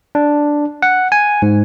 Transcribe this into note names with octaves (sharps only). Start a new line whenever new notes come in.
D4
F#5
G#5
G#2